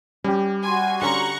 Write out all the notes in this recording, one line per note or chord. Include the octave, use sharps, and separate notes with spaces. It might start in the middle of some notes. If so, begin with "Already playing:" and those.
G3 C#4 G4
F#4 G#5 C6
D3 C#4 A#5 C#6 F#6